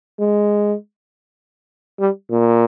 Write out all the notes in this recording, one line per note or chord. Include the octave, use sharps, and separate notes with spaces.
G#3
G3
A#2